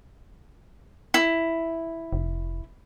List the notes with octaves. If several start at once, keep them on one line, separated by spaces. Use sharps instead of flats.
E4
F1